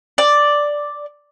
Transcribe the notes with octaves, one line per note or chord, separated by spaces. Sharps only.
D5